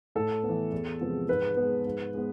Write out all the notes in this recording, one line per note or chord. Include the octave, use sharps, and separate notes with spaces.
A2 A4
B3
E3
E2
C3 F3 G#3 B3
G#2 B4
G#3 B3
G#2
G#3 B3